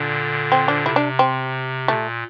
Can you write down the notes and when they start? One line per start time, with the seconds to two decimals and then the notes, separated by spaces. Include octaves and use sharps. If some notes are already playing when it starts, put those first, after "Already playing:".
Already playing: A#2 D3 D4
0.52 C4
0.68 D4
0.86 C3 E4
0.96 D4
1.19 C4
1.88 A#2 A3